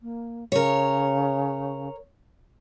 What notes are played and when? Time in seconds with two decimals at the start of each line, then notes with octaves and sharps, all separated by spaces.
0.02 A#3
0.52 C#3 A#4 C#5